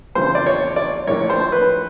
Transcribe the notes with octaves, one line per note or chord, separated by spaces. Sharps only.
E2 C#3 F3 C5
D5
C#5
D5
A#1 A2 F3 C#5
C5
B4